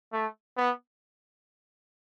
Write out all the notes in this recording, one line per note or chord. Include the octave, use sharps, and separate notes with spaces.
A3
B3